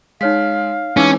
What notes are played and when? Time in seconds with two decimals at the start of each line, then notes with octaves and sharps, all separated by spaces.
0.21 G#3 D#4 C#5 F5 B6
0.97 E3 G#3 C#4 D#4 D6 E6